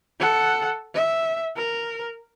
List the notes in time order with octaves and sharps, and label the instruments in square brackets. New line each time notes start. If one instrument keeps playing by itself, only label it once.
[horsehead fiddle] A4 F#5
E5
A#4